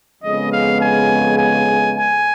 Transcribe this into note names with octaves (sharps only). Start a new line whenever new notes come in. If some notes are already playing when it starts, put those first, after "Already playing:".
F2 C#3 G#3 B3 D#5
F5
G#5
G#5
G#5